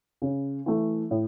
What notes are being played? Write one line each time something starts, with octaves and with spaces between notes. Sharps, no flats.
C#3
E3 A3
A2